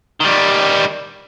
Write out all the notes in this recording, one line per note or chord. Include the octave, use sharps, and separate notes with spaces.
D#3 G3